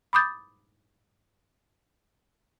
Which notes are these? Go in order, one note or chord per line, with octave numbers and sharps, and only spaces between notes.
B5 D6 D#6 G6 A6